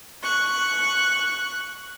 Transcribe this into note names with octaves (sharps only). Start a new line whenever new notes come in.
C#6 F#6